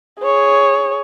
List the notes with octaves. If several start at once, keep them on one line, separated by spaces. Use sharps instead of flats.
G#4 C#5